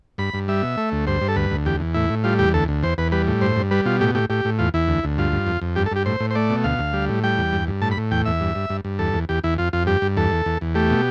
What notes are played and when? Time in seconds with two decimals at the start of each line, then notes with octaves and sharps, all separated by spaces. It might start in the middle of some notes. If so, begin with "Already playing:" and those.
0.18 G2 B5
0.34 G2
0.48 G3 E5
0.63 B2
0.77 A3
0.92 D2
1.07 G2 C5
1.21 G2
1.28 A4
1.36 D2 B4
1.50 D2
1.66 E2 G4
1.80 E2
1.94 A2 E4
2.10 A2
2.24 G3 F4
2.39 E2 G4
2.54 D2 A4
2.68 D2
2.83 E2 C5
2.98 E2 B4
3.12 G3 B4
3.27 A2
3.41 G2 C5
3.56 G2
3.71 G3 B4
3.85 B2 F4
4.01 A2 G4
4.14 A2 G4
4.30 A2 G4
4.45 A2
4.59 E2 F4
4.74 E2 E4
4.88 D2
5.04 D2
5.18 G2 F4
5.32 G2
5.47 F2
5.62 F2
5.76 G2 G4
5.86 A4
5.91 G2 G4
6.06 A2 C5
6.20 A2
6.31 C5
6.35 A3 D5
6.50 B2
6.64 D2 F5
6.79 D2
6.93 G3
7.09 A2
7.24 G3 G5
7.38 E2
7.53 G2
7.67 G2
7.81 A2 A5
7.91 B5
7.97 A2
8.11 E2 G5
8.25 E2 E5
8.41 G2
8.55 G2
8.70 G2
8.85 G2
8.99 E2 A4
9.13 E2
9.29 E2 G4
9.44 E2 E4
9.58 F2 F4
9.73 F2 F4
9.87 G2 G4
10.02 G2
10.17 E2 A4
10.32 E2
10.46 E2
10.61 E2
10.75 A3 G4
10.90 B2